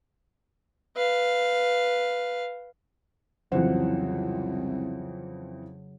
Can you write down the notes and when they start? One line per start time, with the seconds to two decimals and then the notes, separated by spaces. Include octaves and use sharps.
0.96 B4 F5
3.52 C2 F2 C#3 E3 F#3 C5 F#5